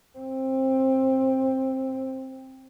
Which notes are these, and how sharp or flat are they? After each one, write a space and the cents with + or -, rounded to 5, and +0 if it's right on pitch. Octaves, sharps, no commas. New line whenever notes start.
C4 +15